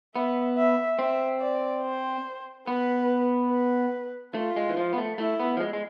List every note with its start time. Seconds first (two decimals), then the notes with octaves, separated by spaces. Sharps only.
0.15 B3 E5
0.58 E5
0.99 C4 E5
1.41 D5
1.83 C5
2.67 B3 B4
3.50 B4
4.34 A3 F4
4.56 G#3
4.69 E3
4.77 F3
4.93 B3
4.98 A3
5.18 A3 E4
5.40 B3
5.57 F3
5.60 G#3
5.73 G#3